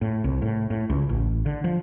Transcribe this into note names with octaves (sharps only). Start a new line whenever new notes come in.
A2
C2
A2
A2
C#2
A1
D3
F3